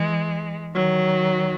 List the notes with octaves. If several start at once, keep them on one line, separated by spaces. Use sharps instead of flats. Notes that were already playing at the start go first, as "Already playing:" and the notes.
Already playing: E3 G#3
D#3 F#3